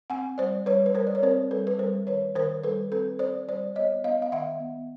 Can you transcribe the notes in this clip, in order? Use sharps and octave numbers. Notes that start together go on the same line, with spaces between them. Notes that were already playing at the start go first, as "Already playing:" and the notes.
C4 F#5 G#5
G3 C5 D5
G3 B4 C#5
B4
G3 A#4 C5
D5
C#5
C4 A#4 C5
G3 A4 B4
B4
G3 A#4 C5
D#3 B4 C#5
D#3 A#4 C5
G3 A4 B4
C4 A4 B4
C4 C5 D5
G3 C5 D5
B3 C#5 D#5
B3 D#5 F5
F5
D#3 E5 F#5
B3